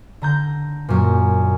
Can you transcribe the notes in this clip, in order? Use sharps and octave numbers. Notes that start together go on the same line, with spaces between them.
D3 A#5 G6
F#2 A#2